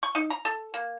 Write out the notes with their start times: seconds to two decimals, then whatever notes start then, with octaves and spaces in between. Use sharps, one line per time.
0.03 C#6
0.15 D#4
0.30 A#5
0.45 A4
0.74 A#3